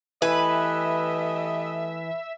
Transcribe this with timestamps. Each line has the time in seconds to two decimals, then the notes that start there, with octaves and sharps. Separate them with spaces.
0.22 E3 A3 G4 B4 D#5 E5 G#5